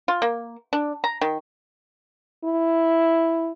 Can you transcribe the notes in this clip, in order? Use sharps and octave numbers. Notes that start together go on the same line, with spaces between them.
F4
A#3
D4
A#5
D#3
E4